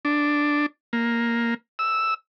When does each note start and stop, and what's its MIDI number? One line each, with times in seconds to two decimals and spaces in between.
0.05 0.66 62
0.93 1.54 58
1.79 2.14 88